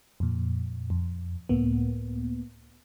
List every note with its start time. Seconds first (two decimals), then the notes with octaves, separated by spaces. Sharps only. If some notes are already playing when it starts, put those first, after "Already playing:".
0.20 F2 A#2
0.90 F2
1.49 C#2 A2 A#3 B3